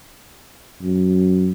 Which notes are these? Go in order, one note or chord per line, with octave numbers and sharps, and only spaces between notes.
F#2